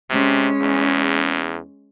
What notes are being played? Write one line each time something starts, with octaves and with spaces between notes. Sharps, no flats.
C3 G#3 C#4
E2